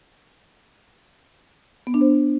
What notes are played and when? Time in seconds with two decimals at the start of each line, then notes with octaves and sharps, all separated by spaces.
1.87 B3
1.94 D4
2.01 C5